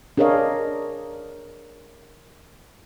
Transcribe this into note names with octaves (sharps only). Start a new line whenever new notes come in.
D4 G#4 A#4 C#5 D#5 F5